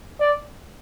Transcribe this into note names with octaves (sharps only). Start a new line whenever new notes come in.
D5